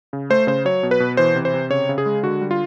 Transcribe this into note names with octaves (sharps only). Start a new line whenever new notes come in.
C#3
A3 C5
C#3 C5
F#3 C#5
B2
B4
B2
E3 C5
C3
C5
C3
C#3 C#5
C#3
G#4
G#3
D3 F#4
G3
F4